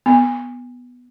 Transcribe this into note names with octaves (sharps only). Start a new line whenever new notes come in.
B3